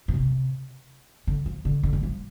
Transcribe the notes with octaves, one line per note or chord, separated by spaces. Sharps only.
A2
C3
D3
F3
D3
D3
G3
F3